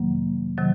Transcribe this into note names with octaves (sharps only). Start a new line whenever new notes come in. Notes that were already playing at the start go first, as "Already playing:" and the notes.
Already playing: F2 C3 D#3 F#3 A#3
C3 D#3 F#3